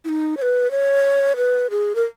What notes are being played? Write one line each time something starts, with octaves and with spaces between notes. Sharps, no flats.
E4
D#4
C#5
B4
C#5
B4
G#4
A#4